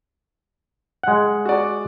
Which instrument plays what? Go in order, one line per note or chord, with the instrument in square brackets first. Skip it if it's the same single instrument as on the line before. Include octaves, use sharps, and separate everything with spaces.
[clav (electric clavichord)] G#3 F#5
[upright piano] F#4 D5